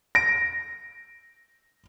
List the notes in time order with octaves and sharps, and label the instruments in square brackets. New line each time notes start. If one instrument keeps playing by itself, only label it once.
[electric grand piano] A#6 D7